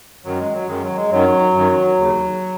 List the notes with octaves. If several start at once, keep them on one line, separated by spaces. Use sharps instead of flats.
F#2 D#3 F#3
G#3
F#3
F#2 D#3 G#3
F#3
G#3
F#2 D#3 F#3
F#2
D#3
D#2 C#3